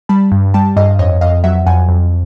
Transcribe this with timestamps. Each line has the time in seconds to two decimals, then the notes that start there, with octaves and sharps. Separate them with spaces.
0.09 G3 A5 B5
0.32 G2
0.54 G3 G5 A5
0.77 G2 D#5 F5
0.99 F2 C#5 D#5
1.21 F2 D#5 F5
1.44 F#3 E5 F#5
1.66 F2 F#5 G#5
1.89 F2